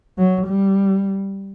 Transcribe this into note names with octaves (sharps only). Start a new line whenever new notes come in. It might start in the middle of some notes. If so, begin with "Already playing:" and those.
F#3
G3